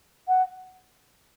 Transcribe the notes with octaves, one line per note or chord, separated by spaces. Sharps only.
F#5